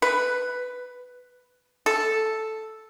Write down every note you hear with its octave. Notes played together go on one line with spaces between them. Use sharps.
B4
A4